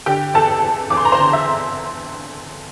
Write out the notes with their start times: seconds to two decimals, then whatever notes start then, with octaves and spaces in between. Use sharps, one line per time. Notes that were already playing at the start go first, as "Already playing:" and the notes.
0.06 D3 G4 G5
0.34 E2 A4 A5
0.63 E2
0.90 E2 D6
0.97 C6
1.05 A#5
1.12 C5 C6
1.18 D3
1.33 E5